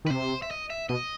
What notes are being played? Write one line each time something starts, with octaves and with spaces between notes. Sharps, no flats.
D#3 B4
C3 C5
E5
D#5
E5
B2 D#5